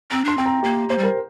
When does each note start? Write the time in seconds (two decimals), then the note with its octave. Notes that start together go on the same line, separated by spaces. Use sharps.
0.11 C4 A#5
0.25 D4 C6
0.38 C4 G5
0.46 A#5
0.63 A#3 G4
0.89 A#3 C5
0.98 G3
1.03 A#4